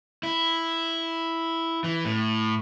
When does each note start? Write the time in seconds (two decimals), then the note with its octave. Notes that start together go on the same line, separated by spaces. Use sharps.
0.23 E4
1.84 E3
2.05 A2